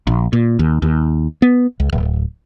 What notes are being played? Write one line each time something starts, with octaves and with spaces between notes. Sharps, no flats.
A#1
A#2
D#2
D#2
B3
C#2
D1